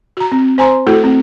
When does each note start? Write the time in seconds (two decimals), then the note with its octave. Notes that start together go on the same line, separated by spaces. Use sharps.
0.17 F#4 A#5
0.32 C4
0.58 C5 G#5 A#5 C6
0.87 A3 E4 F#4 A4
1.04 A3 C4